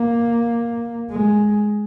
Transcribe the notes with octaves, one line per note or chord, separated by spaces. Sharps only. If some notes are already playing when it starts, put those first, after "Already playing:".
Already playing: A#3
G#3